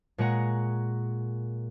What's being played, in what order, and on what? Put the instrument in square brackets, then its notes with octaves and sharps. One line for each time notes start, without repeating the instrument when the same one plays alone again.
[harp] A#2 G#3 G#4 C#5 F#5 A#5